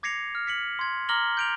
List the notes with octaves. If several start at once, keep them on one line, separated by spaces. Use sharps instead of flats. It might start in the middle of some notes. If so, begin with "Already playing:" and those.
D6 G#6 A#6 C7 C#7 F7
F6
B6 C#7 F#7
C6 G#6
A#5 D6 F6 A#6 F#7 G7
G6 D7 F7